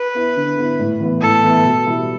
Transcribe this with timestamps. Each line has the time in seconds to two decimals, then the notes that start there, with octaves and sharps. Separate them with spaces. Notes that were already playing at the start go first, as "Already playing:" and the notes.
Already playing: B4
0.15 B3 E4
0.36 D3
0.57 B3 E4
0.79 A2
1.00 E3 B3 E4
1.21 A2 A4
1.43 E3 B3 E4
1.64 B2
1.86 G3 E4 G4